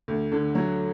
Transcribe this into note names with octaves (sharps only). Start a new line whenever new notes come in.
D2
D3
F#3